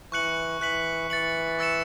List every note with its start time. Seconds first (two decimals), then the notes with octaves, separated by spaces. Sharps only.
0.12 E3 C#6 F#6 C#7 F#7
0.61 E3 F#6 B6 F#7
1.10 E3 A6 C#7 F#7
1.59 C#6 E6 A6 C#7 E7